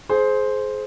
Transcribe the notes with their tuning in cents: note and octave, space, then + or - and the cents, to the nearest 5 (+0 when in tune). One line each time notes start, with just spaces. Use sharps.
G#4 +30 C5 +0